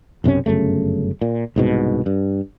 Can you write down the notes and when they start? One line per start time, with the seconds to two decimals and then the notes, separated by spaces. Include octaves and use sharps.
0.24 B1 F#2 C3 C#4
0.46 G1 F#2 C#3 A3
1.21 A#2
1.56 C2 G#2 B2
2.06 G2